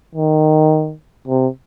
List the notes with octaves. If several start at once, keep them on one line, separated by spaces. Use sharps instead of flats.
D#3
C3